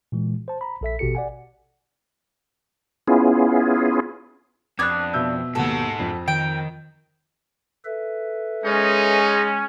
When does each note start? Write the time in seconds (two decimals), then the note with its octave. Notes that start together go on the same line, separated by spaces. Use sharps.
0.12 A#2 E3 G#3
0.48 C5 A5
0.61 A#5 B5
0.81 A#1 A4 E5 B6
0.99 A1 B2 F#4 G4 A4 C#7
1.15 D5 F#5 G#5
3.08 B3 C#4 E4 F4 G#4
4.79 F2 B3 D4 D6 F#6 G#6
5.14 B2 E5 E6 G6
5.55 D#2 G#2 B2 F#4 A4 F#5
5.99 F2
6.28 D#3 G5 D7
7.85 A4 B4 E5
8.65 G#3 C#4 D#4